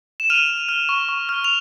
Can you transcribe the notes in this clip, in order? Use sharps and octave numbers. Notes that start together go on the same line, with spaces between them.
E7
F6 D#7 F7
F6
F6
C#6
C#6
F6
F7